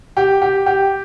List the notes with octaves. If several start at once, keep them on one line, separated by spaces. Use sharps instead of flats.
G4
G4
G4